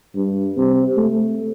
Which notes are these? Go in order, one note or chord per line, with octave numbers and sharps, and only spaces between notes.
G2
C3
A3